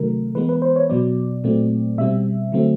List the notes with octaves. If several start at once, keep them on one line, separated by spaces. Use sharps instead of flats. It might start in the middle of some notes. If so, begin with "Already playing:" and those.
Already playing: C3 D#3 F#3 A3 A#4
E3 G#3 B3 B4
B4
C5
C#5
B2 F#3 B3 D5
A#2 F#3 A3 C4
B2 G3 C4 E5
D3 F#3 A3 C4